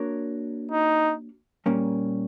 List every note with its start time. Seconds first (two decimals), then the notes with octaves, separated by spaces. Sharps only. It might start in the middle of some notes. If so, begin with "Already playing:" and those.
Already playing: A#3 D4 F#4 A#4 C#5
0.71 D#4
1.66 A#2 G3 A#3 C#4